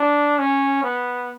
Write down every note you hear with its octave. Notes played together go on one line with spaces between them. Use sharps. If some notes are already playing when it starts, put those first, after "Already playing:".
Already playing: D4
C#4
B3